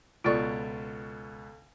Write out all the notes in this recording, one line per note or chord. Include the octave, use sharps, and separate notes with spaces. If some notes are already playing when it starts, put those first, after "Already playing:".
C#2 B2 F4 A4 D5 C#6 A6 D7